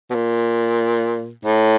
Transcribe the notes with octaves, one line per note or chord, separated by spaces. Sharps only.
B2
A#2
A2